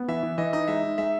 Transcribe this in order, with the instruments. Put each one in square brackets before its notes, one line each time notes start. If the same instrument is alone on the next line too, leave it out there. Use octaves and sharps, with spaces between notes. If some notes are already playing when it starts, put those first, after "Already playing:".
Already playing: [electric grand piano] B3
[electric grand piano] E3 [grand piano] E5
[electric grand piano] E3
[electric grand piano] E3 [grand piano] D#5
[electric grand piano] D#4 [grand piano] D#5
[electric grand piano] G#3 [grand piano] E5
[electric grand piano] D#4
[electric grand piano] G#3 [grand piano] E5